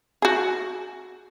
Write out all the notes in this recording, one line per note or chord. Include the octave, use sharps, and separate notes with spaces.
F#4 G#4